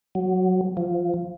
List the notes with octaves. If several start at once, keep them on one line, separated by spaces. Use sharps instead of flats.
F#3
F3